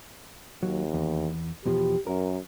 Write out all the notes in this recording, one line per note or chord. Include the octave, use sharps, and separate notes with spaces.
D#2 F#3
E2
E2 B2 F3 G4
F#2 A#4